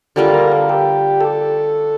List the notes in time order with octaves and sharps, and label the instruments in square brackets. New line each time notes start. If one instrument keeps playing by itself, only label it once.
[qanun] D3 G3 A#3 F4 [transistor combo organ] A4
[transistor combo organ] A#4
A4
G4
A4